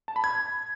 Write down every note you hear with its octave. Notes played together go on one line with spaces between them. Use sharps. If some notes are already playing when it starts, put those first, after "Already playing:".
A5
B5
G#6